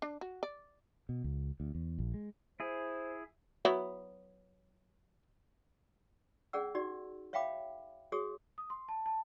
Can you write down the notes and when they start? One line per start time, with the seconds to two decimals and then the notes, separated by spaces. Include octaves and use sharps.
0.02 D4
0.21 F#4
0.43 D5
1.09 B2
1.24 C#2
1.60 D2
1.75 E2
1.98 A#1
2.14 G#3
2.60 E4 G#4 C5
3.65 F#3 B3 E4
6.53 C#4 G#4 D5 F#5 E6
6.75 D#4 F#4 G4 D5
7.33 C#5 E5 F5 G5 B5 D6
8.12 F#4 G#4 C#5 D#6
8.58 D#6
8.70 C6
8.89 A5
9.06 A5